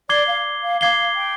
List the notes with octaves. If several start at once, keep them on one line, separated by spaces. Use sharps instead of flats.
D5 D6 G#6 C7 G7
F5
F5
F5 D6 G#6 C7 G7
G5